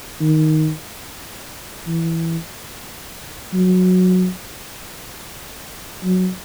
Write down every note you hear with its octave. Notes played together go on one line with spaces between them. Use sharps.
D#3
E3
F#3
F#3